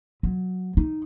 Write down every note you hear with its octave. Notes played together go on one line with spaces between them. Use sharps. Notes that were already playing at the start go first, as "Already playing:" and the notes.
F#3
D#4